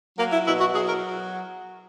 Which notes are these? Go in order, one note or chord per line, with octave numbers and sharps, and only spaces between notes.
F#3 A#3
E4
B2 E4
F#4
F#3 G#4
A#4